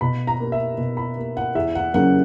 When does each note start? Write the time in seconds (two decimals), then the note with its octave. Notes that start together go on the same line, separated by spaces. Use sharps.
0.01 B2 B5
0.27 A#5
0.40 A#3
0.52 E5
0.78 B2
0.97 B5
1.17 A#3
1.37 F#5
1.55 E2 E5
1.75 F#5
1.94 C#3 F#3 A#3 F#5